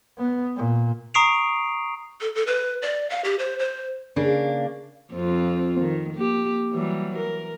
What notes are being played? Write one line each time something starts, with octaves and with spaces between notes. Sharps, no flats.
B3
A#2
A#5 C#6 D#6 C7 D7 F7
A4
A4
B4
D5
F5
G4
C5
C5
C#3 A#3 D4
F2 C4 F4
D#3
A#3 G4
E3 F#3 G3
A#4